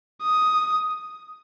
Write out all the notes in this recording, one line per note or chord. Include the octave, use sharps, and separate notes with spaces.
D#6